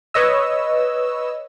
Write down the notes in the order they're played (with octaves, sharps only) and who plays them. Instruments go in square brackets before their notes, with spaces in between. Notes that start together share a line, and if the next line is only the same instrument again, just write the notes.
[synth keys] B4 C#5 D#5 E6